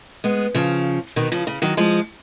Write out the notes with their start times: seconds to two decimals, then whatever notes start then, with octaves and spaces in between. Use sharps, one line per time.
0.24 G#3 B3
0.54 C#3 F3
1.16 B2 D#3
1.32 C#3 F3
1.47 C#3
1.62 D#3 F#3
1.77 F3 G#3